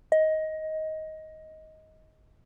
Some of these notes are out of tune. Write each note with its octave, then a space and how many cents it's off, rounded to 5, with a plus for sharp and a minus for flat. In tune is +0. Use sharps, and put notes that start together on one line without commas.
D#5 +15